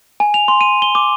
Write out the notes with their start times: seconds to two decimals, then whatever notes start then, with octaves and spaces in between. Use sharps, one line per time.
0.20 G#5
0.34 F7
0.48 C6
0.61 D#7
0.82 G7
0.95 D6